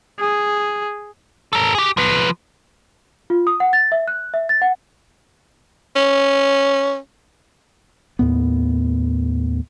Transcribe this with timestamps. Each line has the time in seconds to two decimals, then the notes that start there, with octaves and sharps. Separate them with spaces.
0.19 G#4
1.53 A4 A#4
1.75 G4 G#4
1.97 F3 B4
3.30 F4
3.47 D#6
3.60 F#5
3.73 A6
3.92 E5
4.08 F#6
4.34 E5
4.49 A6
4.62 F#5
5.96 C#4
8.19 D#2 A2 B3